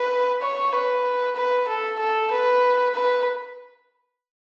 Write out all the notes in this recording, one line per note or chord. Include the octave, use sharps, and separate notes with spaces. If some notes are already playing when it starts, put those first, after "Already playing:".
Already playing: B4
C#5
B4
B4
A4
A4
B4
B4